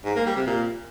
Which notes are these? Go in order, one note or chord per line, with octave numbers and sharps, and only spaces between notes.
G#2
A#3
G3
C3
A#2